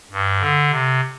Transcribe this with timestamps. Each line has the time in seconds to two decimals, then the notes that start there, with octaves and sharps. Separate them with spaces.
0.12 G2
0.41 D3
0.70 C3